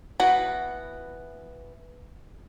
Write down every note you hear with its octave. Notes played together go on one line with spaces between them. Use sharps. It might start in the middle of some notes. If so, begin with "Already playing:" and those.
E3 B3 F#4 F#5